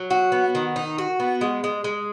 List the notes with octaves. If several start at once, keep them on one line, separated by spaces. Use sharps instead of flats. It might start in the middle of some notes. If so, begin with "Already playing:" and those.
Already playing: F#3
F#4
B3
D#3
D#4
F#4
B3
G#3
G#3
G#3